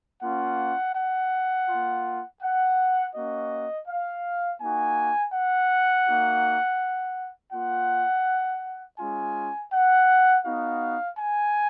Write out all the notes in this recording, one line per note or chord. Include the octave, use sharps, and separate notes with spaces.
A#3 C#4 F4 F#5
F#5
A#3 F4
F#5
A#3 C#4 F#4 D#5
F5
A#3 D#4 F#4 G#5
F#5
A#3 D#4 F#4
A#3 F4 F#5
G#3 C#4 F4 G#5
F#5
B3 D#4 F#4 F5
G#5